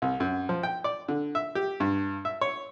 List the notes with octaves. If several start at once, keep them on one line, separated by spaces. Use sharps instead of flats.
C2
F#2
F3
G5
D5
D3
E5
G4
G2
E5
C#5